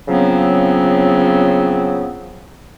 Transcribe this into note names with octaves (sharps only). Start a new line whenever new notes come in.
C#3 F3 F#3 B3 C4